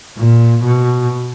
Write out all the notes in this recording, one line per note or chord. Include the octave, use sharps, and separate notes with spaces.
A#2
B2